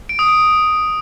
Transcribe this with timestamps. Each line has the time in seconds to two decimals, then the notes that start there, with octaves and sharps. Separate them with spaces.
0.09 D7
0.19 D#6
0.28 D7